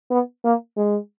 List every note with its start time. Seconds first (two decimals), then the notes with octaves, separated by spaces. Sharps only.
0.11 B3
0.44 A#3
0.77 G#3